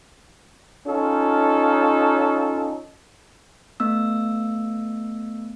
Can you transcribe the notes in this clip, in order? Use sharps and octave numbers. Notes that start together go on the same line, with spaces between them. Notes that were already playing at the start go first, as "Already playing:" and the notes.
C#4 D#4 F4 A4
A3 B3 E6